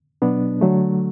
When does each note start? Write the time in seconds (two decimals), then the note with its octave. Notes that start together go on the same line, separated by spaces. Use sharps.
0.22 B2 F#3 B3 D4
0.61 D3 F#3 A3